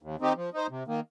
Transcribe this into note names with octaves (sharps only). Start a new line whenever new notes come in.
D#2
D#3 C4 D#4 G4
F3
D#4 C5
C3
D#3 A#3